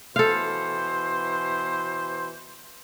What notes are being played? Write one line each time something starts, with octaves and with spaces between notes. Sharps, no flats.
B2 E3 A4 C5 F5